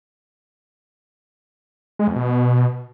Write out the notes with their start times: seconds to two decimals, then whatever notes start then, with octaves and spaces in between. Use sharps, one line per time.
1.99 G#3
2.08 F2
2.16 B2